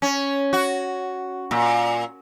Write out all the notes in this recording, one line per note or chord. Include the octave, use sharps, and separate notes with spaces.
C#4
F#4
A#2